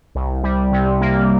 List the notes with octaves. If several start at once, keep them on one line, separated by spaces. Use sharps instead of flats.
C2
G3
C3
A#3